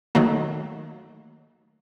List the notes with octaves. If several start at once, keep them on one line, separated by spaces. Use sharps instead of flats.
D#3 F#3 A3 A#3